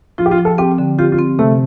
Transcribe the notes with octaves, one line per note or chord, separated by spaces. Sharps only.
F3 F4
G4
F4
F3
A4
C4 G4
D3
F4 G4
F4
C4
C3 A3